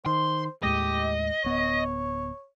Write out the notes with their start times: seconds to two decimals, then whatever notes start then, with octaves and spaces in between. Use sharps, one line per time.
0.06 D#3 C5 C6
0.63 D#2 A2 G#3 G4 D#5
1.44 D1 B3 C#5